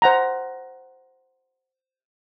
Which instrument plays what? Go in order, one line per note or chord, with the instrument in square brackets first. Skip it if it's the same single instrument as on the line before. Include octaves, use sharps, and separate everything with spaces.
[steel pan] C5 F#5 A#5